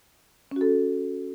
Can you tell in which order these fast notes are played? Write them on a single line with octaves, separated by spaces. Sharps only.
C#4 F#4 A4